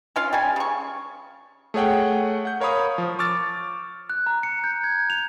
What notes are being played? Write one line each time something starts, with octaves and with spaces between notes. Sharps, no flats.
C#4 F4 F5
G3 C#4 G#5
C#3 C#6
A3 G#4 C#5 F#5 G5
F#5 G6
A#4 C#5 F5 B5 D#6
F3
C#6 D6 E6 F6 A6
F#6
A#5
C#7
G6
G#6
F7